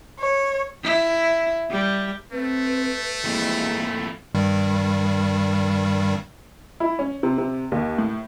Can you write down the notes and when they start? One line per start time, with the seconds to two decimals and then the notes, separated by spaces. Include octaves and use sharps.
0.19 C#5
0.83 E4
1.70 G3
2.32 A3 C4 B4
3.24 F2 A2 E3 G#3 A#3 E4
4.35 G2 D#3 G3
6.80 E4
6.99 C#4
7.23 C3
7.38 C3
7.72 D#2
7.98 A2